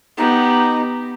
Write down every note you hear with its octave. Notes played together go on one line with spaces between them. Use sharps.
B3 D#4 G4